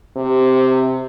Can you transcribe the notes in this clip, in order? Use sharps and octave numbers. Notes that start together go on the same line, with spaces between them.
C3